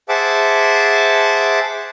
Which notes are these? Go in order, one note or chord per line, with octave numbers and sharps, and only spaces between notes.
G#4 C5 E5 F#5 A5 D6